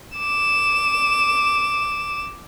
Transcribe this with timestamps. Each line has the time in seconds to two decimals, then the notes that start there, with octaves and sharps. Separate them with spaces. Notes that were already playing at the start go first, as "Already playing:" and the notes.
0.18 D6 E7